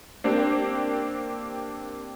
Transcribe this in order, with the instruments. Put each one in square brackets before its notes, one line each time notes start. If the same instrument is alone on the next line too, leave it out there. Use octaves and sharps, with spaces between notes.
[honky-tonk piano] A#3 C4 D4 G4